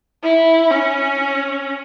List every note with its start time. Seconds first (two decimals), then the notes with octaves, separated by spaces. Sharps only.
0.23 E4
0.71 C#4